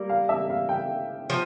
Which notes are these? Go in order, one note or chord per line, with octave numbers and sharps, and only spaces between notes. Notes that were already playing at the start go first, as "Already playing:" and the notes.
Already playing: G3 A#3
F5
E5
F5
G5
F3